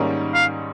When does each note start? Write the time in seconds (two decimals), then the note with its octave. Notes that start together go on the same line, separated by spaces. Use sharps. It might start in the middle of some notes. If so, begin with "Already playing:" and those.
Already playing: G#2 D#3 G3 A#3 C#4
0.34 F5